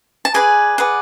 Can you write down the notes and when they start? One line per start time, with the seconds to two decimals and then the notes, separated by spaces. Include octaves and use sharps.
0.25 A5
0.34 G#4 B4 D5 G#5
0.78 G#4 B4 D5 F#5